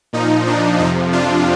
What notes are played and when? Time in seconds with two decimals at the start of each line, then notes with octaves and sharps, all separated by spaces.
0.13 A#2 F3 D#4
0.47 D4
0.79 F2 C3 F3 D#4
1.13 D4 F4